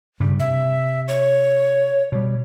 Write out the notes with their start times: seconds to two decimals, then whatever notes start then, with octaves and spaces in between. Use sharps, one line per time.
0.20 G2 C#3 G3
0.40 C3 E5
1.08 C#5
2.12 B2 G3